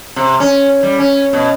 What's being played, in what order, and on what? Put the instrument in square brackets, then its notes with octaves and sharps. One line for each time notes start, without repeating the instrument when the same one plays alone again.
[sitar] C3
C#4
G3
C#4
B2